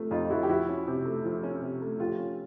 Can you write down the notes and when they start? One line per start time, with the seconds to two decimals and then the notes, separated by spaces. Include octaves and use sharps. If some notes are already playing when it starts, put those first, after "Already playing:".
Already playing: C3 F3 A3
0.11 F2 D#4 F4
0.30 F3 E4 F#4
0.43 G4
0.49 F3 E4 F#4
0.69 C#4
0.87 C3
1.05 A3
1.25 F3
1.43 C#4
1.62 C3
1.82 A3
2.00 F3 F4 G4
2.18 C#4